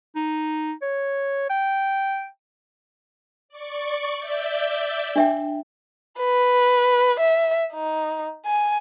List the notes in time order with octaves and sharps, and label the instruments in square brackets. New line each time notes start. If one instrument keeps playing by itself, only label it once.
[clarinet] D#4
C#5
G5
[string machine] D5 C#6
D5 E5 G6
[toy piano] D4 E5 G5
[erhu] B4
E5
D#4
G#5